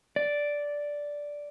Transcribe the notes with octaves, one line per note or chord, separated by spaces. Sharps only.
D5